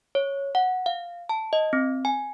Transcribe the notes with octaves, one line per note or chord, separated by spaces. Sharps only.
C#5
F#5
F5
A5
D#5
C4
G#5